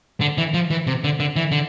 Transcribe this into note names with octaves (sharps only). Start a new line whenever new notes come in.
D3
E3
F3
E3
C3
D3
D3
E3
D3